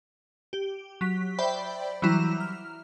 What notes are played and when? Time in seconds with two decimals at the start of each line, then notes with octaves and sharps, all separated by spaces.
0.53 G4
1.01 F#3 B6
1.39 C5 D5 E5 G5 B5
2.02 E3 F#3 G3 E4 A#5
2.40 F6